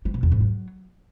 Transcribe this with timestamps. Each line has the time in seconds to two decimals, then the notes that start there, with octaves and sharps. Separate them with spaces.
0.05 G3
0.14 B2
0.23 E2
0.32 G#2
0.40 F#3